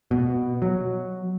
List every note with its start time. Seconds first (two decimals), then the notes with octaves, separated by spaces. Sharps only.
0.11 B2
0.62 F#3